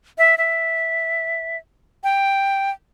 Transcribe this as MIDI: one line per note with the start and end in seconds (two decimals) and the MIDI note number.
0.18 0.35 76
0.38 1.57 76
2.04 2.71 79